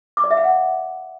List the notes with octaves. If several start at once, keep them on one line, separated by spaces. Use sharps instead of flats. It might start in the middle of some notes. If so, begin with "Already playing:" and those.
D6
D5
E5
F5
F#5